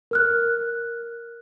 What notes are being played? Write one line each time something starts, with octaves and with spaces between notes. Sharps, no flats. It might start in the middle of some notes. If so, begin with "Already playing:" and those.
A#4 F6 F#6